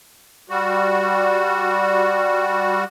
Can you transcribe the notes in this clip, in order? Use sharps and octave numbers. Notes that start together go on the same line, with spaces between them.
G3 F#4